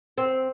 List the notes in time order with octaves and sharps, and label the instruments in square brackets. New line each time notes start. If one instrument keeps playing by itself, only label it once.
[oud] C4